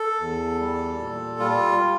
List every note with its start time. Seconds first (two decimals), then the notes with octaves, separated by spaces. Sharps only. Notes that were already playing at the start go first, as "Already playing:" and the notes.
Already playing: A4
0.20 E2
0.60 G3
0.99 A#2
1.39 G3 F4
1.79 G3